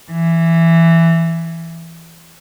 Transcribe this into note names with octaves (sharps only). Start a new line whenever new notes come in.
E3